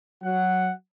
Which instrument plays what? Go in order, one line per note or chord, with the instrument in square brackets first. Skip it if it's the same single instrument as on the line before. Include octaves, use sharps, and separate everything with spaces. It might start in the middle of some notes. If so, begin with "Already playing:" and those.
[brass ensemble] F#3 F#5